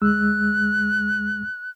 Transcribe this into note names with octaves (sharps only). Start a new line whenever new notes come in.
D2 G#3 E6 F#6